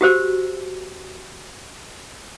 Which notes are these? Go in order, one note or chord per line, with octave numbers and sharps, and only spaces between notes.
F#4 G4 C5 E6